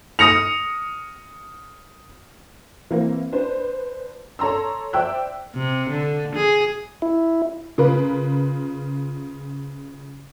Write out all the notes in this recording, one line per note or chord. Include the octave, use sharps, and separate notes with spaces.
D#6 A#6 C#7 F7
E3 A#3 C4
D4 B4 C5
A4 C#5 A#5 C6 E6
C5 D5 E5 G5 E6 F#6
C3
D3
G#4
E4
C#3 F4 A#4 B4